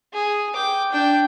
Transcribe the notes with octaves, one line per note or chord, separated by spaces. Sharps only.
G#4
G5 D6
D4 G5